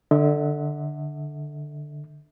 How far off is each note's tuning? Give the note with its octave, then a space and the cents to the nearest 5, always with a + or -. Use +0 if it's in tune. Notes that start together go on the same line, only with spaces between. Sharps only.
D3 +10 E5 -35